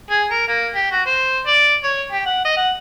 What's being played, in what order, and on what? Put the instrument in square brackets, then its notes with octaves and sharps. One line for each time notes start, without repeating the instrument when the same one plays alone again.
[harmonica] G#4
A#4
A#3
G4
F#4
C5
D5
C#5
G4
F#5
D#5
F#5